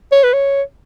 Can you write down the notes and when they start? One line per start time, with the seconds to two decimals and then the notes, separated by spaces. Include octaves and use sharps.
0.12 C#5
0.23 B4
0.33 C#5